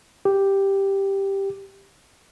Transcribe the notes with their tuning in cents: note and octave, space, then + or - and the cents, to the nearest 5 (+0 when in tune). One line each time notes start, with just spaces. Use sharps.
G4 +0